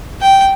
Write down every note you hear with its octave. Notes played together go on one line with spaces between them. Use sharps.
G5